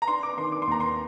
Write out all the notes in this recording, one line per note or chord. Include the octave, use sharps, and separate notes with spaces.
A#5
D4 C6
D6
D#3 C6
D6
C6
D#2 A#5
C6